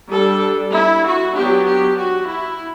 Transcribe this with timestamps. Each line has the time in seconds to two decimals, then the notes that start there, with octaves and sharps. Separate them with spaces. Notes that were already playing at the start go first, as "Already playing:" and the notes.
0.12 G3 D4 A4
0.74 E4
1.05 F#4
1.36 F#3 B3 D4 G4
1.67 G4
1.99 F#4
2.29 E4